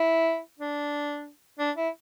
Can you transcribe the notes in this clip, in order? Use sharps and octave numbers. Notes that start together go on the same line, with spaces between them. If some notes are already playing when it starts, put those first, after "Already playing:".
Already playing: E4
D4
D4
E4